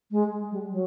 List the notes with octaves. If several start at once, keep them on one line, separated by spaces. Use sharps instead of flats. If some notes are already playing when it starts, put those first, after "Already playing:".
G#3
G3
F#3